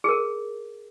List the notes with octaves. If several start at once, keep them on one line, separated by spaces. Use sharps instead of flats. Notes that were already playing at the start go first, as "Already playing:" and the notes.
G#4 A#4